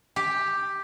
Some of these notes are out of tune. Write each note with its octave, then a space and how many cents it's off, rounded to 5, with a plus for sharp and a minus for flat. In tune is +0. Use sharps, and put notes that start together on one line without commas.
G4 +5